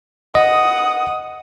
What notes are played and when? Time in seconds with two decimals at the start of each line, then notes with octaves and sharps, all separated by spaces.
0.35 D#5 F#5 D#6